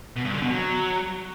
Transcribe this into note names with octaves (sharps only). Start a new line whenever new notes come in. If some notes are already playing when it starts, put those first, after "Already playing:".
B2
G2
D3
B2
F#3